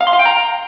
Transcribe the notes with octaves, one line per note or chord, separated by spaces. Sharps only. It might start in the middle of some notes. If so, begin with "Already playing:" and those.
F5
C6
F5
G5
A#5